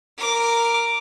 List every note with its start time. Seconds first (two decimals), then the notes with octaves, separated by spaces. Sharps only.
0.17 A#4 D6